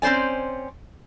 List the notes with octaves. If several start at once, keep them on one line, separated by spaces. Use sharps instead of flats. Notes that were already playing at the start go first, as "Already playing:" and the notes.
C4 C#4 C5 D5 G#5